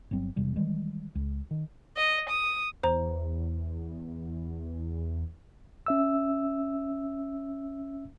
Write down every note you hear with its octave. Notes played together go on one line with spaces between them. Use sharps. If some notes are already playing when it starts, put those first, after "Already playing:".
G1 F#3 C4
E1 C3 G3
D#3 E3 G3 G#3
C#2
D#3
D#5
D#6
E2 C5 A#5
C#4 E5 E6